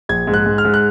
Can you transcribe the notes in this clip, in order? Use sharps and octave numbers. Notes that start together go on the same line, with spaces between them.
A#1 G#6
G#2
F#6
G#2
F6
G#2
F#6